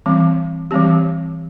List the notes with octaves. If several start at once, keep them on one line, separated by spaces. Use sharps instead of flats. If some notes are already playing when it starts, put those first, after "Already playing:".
E3 G3 C4
E3 G3 C4 G4